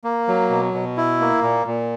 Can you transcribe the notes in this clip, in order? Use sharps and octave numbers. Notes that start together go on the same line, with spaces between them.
A#3
F#3
B2
B2
E4
A#3
A#2
A#2